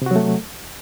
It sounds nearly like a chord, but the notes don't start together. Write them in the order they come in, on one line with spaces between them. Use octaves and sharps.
C3 F#4 F#3 A3